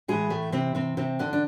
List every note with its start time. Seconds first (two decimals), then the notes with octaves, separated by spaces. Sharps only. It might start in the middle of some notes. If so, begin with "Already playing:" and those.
0.08 A2 E3 G#3 G#4
0.30 A2 A3
0.52 C3 C4
0.75 C3 C4
0.97 C3 C4
1.19 D3 D4
1.33 D4